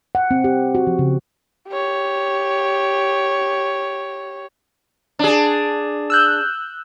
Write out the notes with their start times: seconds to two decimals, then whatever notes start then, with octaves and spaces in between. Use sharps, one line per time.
0.15 F#5
0.31 C4
0.44 G4
0.75 F#4
0.87 F3
0.99 C#3
1.69 G4 C#5
5.19 D4 G#4
6.10 E6 F#6 G6